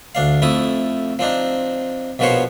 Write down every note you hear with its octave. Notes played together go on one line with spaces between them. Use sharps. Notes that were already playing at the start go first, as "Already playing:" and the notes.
D2 D4 F5
F2 A3 E4 D#6
F3 C4 D4 D#4
A#1 B2 F3 B3 C5 C#5